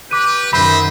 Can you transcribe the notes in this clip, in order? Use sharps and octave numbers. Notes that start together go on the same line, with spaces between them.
G4 B4 D6 D#7
F#2 D#3 D#4 C5 E5 B5